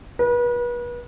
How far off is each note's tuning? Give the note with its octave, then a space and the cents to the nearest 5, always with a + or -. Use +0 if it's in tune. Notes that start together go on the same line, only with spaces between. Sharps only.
B4 -35